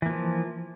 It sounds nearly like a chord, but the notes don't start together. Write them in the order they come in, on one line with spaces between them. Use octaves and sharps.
E3 A#3 F3